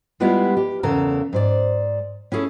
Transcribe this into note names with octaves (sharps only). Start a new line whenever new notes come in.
G3 G#3 B3 E4 F4 G4
G4
E2 C#3 A4 A#4 A#5
G#2 C5 D5
C#4 E4 G#4 A4